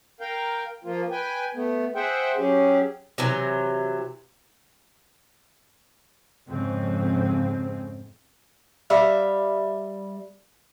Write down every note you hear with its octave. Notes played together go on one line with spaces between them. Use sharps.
A#4 F5 G5
F3 A#3 F4
B4 G5 G#5
A3 B3
G#4 C5 E5 F#5 G5
F#3 C#4 G4 G#4
C3 E3 F#3
F2 G#2 C#3 C4
G3 E5 F5